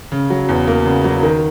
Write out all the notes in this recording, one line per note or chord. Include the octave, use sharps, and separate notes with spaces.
C#3
F#3
E2
A#3
C#3
F#3
D#3